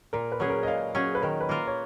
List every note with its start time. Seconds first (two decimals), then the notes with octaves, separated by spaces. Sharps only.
0.13 A#2 A#4
0.32 B4
0.40 F#3 C#4 G#4
0.50 A#4
0.63 D#5
0.67 A#2 F5
0.95 F#3 C#4 G#4
1.15 B4
1.22 D#3 A#4
1.41 B4
1.49 A#3 F4 A#4
1.68 C#5